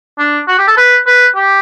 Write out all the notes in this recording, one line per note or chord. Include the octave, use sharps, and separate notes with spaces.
D4
F#4
G4
A4
B4
B4
G4